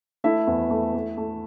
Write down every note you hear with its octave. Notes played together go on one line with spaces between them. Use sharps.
A3 E4 E5
E2
A3
A3
A3